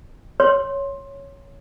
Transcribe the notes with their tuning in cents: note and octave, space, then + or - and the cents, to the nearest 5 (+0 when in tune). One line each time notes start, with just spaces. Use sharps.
C#5 +0 C6 +15